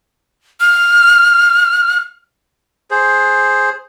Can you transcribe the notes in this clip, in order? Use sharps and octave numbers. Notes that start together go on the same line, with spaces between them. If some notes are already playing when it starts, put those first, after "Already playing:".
F6
G#4 C5